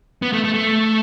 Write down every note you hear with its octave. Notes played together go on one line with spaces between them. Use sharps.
B3
A3
A3
A3